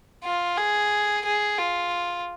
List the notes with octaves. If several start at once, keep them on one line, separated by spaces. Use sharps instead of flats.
F4
G#4
G#4
F4